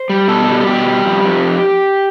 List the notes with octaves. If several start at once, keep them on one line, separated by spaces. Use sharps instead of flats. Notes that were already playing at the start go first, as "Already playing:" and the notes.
Already playing: C5
G3
B2 A4
G3
A4
B2 G4
G3
F2
F2